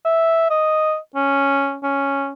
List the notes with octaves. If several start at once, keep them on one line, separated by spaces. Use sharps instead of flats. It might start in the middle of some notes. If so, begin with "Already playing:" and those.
E5
D#5
C#4
C#4